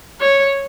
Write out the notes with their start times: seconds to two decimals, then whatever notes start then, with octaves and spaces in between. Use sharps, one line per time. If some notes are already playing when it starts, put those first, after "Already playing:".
0.21 C#5